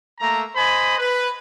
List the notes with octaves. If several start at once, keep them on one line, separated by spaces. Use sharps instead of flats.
A3 A#3 A#5
C5 D#5 G#5 B5
B4